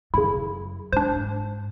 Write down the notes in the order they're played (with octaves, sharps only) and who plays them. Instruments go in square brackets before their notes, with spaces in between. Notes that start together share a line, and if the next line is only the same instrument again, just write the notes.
[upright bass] F#2 [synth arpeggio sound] C#3 E4
[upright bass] G#2 [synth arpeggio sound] D4 C5